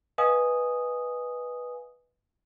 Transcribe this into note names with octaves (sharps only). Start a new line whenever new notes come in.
B4 D#5 F5 G#5 D#6